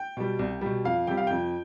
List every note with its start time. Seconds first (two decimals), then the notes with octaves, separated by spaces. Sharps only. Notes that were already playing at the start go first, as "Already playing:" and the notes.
Already playing: G5
0.17 B2 G3
0.39 C2
0.61 B2 G3
0.84 F2 F5
1.07 C3 G3 G5
1.17 F5
1.27 F2 G5